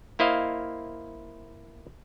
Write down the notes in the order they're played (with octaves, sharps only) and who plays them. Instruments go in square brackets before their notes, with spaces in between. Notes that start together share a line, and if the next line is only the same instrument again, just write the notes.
[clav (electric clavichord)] A#3 E4 C5 D#5 F5